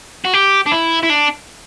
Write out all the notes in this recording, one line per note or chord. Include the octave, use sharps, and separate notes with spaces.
F#4
G4
D4
E4
E4
D4